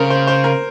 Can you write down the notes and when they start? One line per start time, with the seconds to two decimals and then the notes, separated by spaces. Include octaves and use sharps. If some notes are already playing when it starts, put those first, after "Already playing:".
Already playing: C#3 A#4 C5
0.10 C5
0.27 C5
0.44 A#4